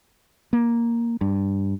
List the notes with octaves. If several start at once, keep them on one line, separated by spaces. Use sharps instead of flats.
A#3
G2